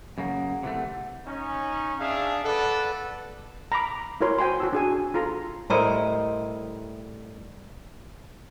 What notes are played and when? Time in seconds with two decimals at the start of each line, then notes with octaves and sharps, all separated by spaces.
0.18 F#2 C#3 A#3 F#5
0.63 C3 E3 A3
1.26 C#4 D#4
1.99 D4 G#4 E5 F5
2.45 A4 B4 D5 F#5
3.72 A#5 B5 D6
4.21 E4 F#4 A#4 C#5 C6
4.39 C5 G5 G#5 C6
4.60 F#4 A5 E6
4.73 D4 G#4 G#5
5.14 F4 A4 A#5 C6
5.70 A2 G3 E4 A#4 C5 D#5